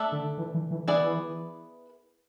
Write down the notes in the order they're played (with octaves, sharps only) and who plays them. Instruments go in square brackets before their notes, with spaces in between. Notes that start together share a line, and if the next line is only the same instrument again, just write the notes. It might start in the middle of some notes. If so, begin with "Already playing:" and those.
Already playing: [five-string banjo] A3 D4 A4 E5
[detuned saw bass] D3
E3
E3
E3
[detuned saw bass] E3 [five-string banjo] B3 E4 G#4 B4 D5